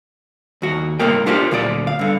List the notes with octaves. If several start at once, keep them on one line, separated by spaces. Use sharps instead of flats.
D#2 F#4
C2 G#2 A3 A#3 A#4 G5
D4 F4 G4 A#4 C5 F5
D2 A#2 A#4 D5
F5
G2 D3